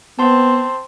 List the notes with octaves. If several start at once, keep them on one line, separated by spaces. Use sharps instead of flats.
B3 C4 A5 C6